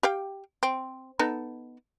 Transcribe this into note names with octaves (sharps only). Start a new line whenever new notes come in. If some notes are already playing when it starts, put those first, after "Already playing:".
G4 F5 G5
C4
B3 D#4 A4